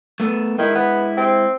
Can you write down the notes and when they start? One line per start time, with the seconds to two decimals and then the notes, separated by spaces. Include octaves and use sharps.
0.20 A3 B3
0.58 D#3 G#3 E4
0.75 B3
1.17 C4